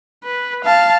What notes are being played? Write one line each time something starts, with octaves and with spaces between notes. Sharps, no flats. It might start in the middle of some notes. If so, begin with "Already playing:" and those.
B4
F5 A5